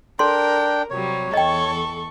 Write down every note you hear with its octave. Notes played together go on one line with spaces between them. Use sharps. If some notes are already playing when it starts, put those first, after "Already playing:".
D4 A4 A#4 G5 C6
C3 F#3 G3 C#5
E2 A4 D#5 G5 C#6